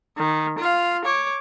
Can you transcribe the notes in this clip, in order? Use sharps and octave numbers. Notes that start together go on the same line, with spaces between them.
D#3
F4 F5
C#5 D6